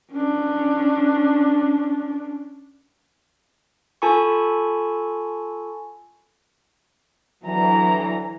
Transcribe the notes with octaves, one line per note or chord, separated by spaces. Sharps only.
C#4 D4
F4 A4 G#5 A5 B5 C#6
D2 E3 F#3 A#5